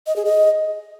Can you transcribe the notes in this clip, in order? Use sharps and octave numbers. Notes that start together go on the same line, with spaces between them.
D#5
G#4
D#5